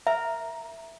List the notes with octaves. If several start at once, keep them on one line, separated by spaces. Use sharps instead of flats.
A#4 E5